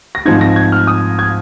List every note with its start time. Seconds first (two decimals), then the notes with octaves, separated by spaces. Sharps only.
0.15 A#6
0.25 G#2 F3 C4 D#4 G#6
0.41 A#6
0.56 G#6
0.72 F6
0.87 D#6
1.19 G#6